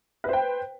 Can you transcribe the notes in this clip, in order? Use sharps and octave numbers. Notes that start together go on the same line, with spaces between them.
B4 C5 G5